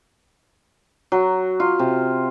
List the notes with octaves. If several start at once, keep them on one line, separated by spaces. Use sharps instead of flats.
F#3
F4
C3